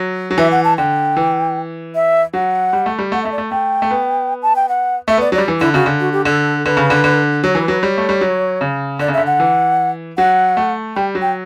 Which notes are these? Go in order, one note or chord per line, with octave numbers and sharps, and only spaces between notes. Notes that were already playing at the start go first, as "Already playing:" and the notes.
Already playing: F#3
F#3
E3 E5
F#5
A5
D3 G5
E3
E5
F#3 F#5
G3
A3
G3
A3 F#5
E5
A3
D5
A3
A3 G5
A3
B3
A5
G5
F#5
A3 E5
B3 D5
F#3 D5
G3
E3
D3 E4
C#3 F#4
D3
F#4
G4
D3 A4
D3 B4
C#3
D3
D3
F#3 C#5
E3 B4
F#3 B4
G3 C#5
A3
G3
F#3
C#3
D3 D5
C#3
E5
D3
F#5
E3
F#3 F#5
A3
G3 G5
F#3
G5